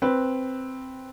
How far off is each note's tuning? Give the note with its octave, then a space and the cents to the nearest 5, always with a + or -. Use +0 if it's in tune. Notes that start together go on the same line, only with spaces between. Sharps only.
C4 +0 B4 +0